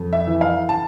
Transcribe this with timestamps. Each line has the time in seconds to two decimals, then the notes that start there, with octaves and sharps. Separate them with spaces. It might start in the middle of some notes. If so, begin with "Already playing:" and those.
Already playing: F2
0.13 E5
0.27 E3
0.41 F5
0.69 A5